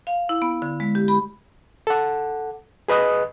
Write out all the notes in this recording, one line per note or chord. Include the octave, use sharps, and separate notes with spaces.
F5
E4
B3
D3
G#3
G4
B5
A4 F#5
G#4 B4 D#5 D#6 F#6